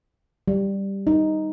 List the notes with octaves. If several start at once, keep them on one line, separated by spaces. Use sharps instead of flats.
G3
D#4